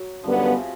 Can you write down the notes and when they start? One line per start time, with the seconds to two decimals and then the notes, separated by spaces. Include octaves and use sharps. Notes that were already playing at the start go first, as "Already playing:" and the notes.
Already playing: F#3
0.24 F#2 D3 F3 G3 B3
0.35 C#3
0.45 C#3
0.57 C3